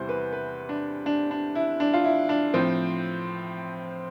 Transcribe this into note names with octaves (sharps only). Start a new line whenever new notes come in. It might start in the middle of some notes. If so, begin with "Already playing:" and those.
Already playing: E2 C3 E3 G3 C5
B4
B4
D4
D4
D4
E4
D4
F4
E4
D4
A2 F3 C4